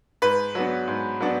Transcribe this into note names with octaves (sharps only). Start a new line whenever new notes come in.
G#2 B4
F#3 B3 D4
G#2
F#3 B3 D4